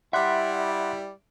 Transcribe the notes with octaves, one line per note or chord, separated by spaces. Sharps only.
G3 E4 D5 E5 F#5 C6 F#6